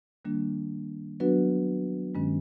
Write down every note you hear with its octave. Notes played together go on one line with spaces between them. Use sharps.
D#3 G3 A#3 D4
F#3 B3 D4 F#4 B4
G2 D#3 G#3 C#4